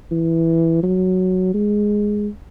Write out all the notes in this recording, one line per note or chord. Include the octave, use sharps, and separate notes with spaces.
E3
F#3
G#3